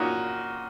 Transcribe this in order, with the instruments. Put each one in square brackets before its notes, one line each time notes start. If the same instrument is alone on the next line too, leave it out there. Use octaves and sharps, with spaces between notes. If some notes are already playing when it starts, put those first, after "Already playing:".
Already playing: [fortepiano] A#2 C#4 D#4 F4 F#4